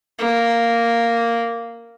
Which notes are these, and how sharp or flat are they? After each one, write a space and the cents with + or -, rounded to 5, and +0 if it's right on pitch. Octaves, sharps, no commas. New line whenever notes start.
A#3 -5